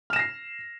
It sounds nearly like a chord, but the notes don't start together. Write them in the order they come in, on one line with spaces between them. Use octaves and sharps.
F6 E7 A#6 C7